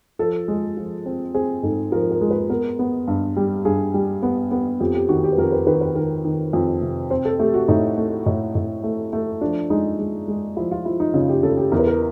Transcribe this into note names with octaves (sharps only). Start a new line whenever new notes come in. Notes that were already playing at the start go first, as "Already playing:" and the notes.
F3 A4
G#3
F3
C4
C4 G#4
G#2 A4
F3 A#4
A#4
G#3
B4
B3 A#4
B3
G2
G3
G2 G#4
G3
B3
B3
F2 G4
G4
D#3 F#4
G4
B4
F2 A#4
B4
D#3 B4
B4
D#3 A#4
D#3
F2
C3
C4 C5
A4
A3 G4
F#4
A2 D#4
A3
A2
A2
A3
A3
F3 D4
G#3 D#4
G#3
G#3
F3 E4
F4
F3 E4
D#4
C#3 F4
G4
C#3 A4
G4
E2 A#4
B4
A#4